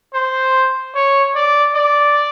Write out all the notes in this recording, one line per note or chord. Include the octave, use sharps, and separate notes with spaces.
C5
C#5
D5
D5